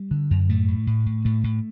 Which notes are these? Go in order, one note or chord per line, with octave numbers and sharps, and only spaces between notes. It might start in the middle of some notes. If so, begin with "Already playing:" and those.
Already playing: G3
D3
F#2
A2 A3
A2
A2
A2
A2 A3
A2